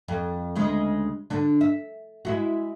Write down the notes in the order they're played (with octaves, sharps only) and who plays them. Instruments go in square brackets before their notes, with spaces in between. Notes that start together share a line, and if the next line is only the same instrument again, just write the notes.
[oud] F2
D2 C#3 G#3
D3 D4
E5
G#3 E4 F#4